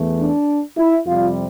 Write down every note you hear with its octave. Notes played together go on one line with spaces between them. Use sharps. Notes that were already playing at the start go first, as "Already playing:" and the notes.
Already playing: E2 E3 A3
D4
E4
F2 C3 G3 C4 F4